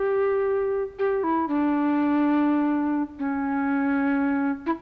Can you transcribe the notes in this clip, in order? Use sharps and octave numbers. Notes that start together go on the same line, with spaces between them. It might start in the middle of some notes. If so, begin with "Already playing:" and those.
Already playing: G4
G4
E4
D4
C#4
E4